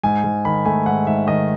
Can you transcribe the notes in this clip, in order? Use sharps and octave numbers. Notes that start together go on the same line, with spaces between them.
G#2 G#5
G#2
D#3 B5
A3 G#5
G#2 F#5
G#2 E5
D#3 D#5